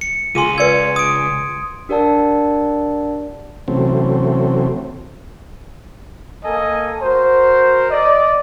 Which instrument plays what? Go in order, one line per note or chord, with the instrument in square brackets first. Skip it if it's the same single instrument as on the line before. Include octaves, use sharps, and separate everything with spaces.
[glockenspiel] C#7
[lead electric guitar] C#2 [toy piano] F4 G#4 G#5 [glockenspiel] C6 D#7
[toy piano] B4 D5 E6 [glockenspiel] G#6 C#7
[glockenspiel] D#6 D7
[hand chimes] D4 G4 A#4 D5 F#5 A5
[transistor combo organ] C3 E3 F#3 A3 C4 C#4
[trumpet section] A#3 A4 D#5 G#5
F#4 A#4 C5
D5 D#5